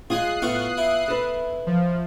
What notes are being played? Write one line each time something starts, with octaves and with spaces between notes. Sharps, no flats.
G#3 F4 G#4 G#5 D#6 F#6 C7
A2 B3 F4 F5 C#6
E4
A4 B4
F3